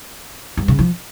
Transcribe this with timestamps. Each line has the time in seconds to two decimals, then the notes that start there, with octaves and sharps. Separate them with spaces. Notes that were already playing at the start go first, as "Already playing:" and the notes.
0.57 G2
0.68 C#3
0.79 F3